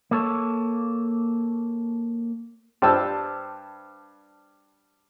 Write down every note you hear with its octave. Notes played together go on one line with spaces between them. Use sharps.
A#3 A4 C#5
G2 G3 C5 A5 E6